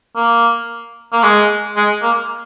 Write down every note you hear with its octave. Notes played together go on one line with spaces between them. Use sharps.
A#3
A#3
G#3
G#3
A#3